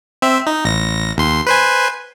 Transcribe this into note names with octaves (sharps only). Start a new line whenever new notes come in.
C4 E5
D#4
A1 A#6
D#2 C6
B4 C5 G#5